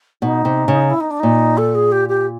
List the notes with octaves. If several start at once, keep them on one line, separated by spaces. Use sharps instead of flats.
B2 D#4
C3
C#3
E4
D#4
D4
A#2 D#4
A4
G#4
G4
G4